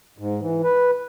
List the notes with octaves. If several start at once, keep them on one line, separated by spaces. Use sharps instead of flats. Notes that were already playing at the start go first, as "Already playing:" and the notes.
G#2
E3
B4